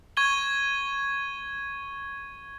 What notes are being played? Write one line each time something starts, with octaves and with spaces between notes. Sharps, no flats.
C#6 G#6 D#7 G7